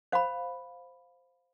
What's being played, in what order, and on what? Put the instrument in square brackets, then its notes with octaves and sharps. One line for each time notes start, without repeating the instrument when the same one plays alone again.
[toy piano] C5 F5 B5